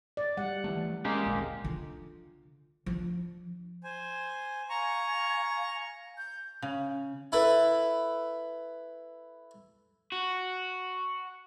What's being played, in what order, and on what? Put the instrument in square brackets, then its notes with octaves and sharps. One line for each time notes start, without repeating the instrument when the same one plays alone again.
[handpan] D5
G3 F#5
[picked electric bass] E3 F3 A3
[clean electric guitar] G#3 A#3 G4 [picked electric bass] C#4
[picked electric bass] G#1 D2 A#2
[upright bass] D3 F4
F3 D4
[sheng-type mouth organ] C5 G#5
[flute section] F5 G#5 [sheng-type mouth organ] A#5 C#6
[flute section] G6
[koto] C#3
[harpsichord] E4 A4 B4
[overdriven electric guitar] F#4